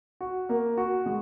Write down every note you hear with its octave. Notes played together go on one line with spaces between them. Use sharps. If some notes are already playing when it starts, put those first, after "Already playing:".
F#4
A#3
F#4
G#3